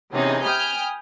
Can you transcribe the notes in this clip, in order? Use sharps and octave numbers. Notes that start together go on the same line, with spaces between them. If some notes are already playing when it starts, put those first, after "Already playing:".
C3 E3 B3 C#4 D#4 G#4
G5 G#5 B5 D#6 F6 G6